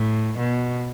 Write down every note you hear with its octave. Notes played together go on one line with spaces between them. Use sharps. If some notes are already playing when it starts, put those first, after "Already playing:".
Already playing: A2
B2